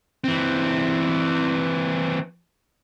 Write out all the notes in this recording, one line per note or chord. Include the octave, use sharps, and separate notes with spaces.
E3 C4